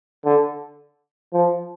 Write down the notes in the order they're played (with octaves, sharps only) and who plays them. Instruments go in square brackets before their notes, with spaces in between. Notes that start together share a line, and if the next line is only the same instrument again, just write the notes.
[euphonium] D3
F3